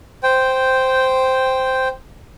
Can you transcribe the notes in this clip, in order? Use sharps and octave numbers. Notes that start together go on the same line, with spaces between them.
C5 G5